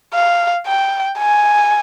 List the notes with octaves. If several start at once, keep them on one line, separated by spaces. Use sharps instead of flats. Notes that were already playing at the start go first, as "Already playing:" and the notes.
F5
G5
G#5